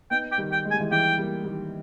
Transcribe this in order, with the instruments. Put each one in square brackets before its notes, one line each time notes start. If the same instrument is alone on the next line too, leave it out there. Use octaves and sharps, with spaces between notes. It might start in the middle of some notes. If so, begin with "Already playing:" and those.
[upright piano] B3 D#4 [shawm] G5
[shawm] G5
[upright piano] D#3 G3
[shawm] G5
[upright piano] G#3
[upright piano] G3 [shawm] G#5
[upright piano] E3 G#3
[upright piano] E3 G#3 [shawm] G5
[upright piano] G3 A#3
D#3 G3